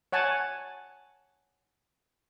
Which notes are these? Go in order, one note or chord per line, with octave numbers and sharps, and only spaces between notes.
C#5 F#5 G#5 A5